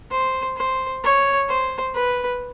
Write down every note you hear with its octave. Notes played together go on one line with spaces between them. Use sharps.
C5
C5
C#5
C5
B4